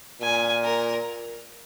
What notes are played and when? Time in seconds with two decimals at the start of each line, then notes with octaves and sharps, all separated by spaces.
0.21 A#2 G#5
0.64 A#4